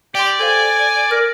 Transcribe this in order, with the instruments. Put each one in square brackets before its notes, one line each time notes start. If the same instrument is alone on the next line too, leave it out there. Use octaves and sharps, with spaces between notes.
[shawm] G4 [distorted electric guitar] D5 [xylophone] G5 C6
[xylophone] A4 C5 F5 [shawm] G#5
[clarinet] A#4 [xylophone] F6